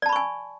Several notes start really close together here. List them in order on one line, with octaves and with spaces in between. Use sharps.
D5 A5 B5 C#6 G#5